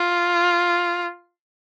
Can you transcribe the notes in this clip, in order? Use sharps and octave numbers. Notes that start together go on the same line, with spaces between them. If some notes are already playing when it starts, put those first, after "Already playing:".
Already playing: F4